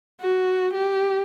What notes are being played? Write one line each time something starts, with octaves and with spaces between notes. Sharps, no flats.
F#4
G4